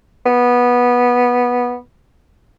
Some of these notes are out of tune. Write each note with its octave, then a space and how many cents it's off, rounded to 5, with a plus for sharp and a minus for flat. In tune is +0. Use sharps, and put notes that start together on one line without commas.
B3 -15